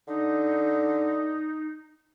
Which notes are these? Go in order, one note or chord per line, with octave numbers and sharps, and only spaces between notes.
D3 D#4